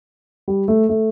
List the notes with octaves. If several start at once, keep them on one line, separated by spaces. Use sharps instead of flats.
G3
A3
A3